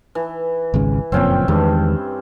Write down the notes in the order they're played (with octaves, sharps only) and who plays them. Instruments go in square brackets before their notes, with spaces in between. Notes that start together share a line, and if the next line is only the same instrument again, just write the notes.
[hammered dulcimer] E3
[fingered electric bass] G#1 C#2 C#3
[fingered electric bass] F#1 F2 A#2 [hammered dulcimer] C4 C#4 G5
[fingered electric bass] E2 D#3 G#3 [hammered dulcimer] G2